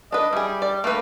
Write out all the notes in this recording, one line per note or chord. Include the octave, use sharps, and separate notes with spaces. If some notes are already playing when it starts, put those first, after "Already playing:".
D4 B4 D#5
G3 E4 G#4
D5
A3 A#3 B4